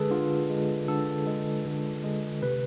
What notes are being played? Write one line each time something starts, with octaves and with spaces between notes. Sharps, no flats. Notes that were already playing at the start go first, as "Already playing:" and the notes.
Already playing: D3 G#3 G#4 A4 B4
D3 F4
G#3
D3 A4
G#3
D3
G#3
C3 B4